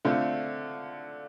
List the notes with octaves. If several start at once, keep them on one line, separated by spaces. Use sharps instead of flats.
D3 A3 C4 F4